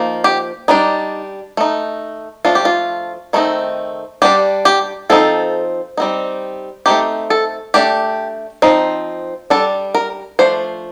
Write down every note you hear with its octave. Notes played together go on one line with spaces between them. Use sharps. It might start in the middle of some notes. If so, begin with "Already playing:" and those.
Already playing: F3 A#3 D#4
G4
G3 D4 D#4
A3 D#4
F3 A3 D4 F4
G4
F4
D#3 A3 C4 D#4
G3 D4 G4
G4
F3 C4 D#4 A4
G3 C4 D#4
A3 C4 D#4 G4
A4
A3 D4 G4
F3 C4 D#4
G3 D4 A4
A#4
F3 A3 D4 C5